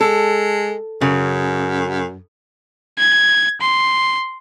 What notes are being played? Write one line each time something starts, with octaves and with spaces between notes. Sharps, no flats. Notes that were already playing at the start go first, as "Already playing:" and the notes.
G#3 A4
F#2 C#3
G#6
C6